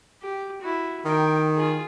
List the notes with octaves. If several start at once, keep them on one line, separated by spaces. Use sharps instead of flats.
G4
E4 F#4
D#3 A#4 G5
F4 G#4